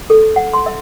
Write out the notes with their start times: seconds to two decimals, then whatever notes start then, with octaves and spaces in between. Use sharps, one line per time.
0.10 A4
0.36 F#5
0.53 C6
0.66 E5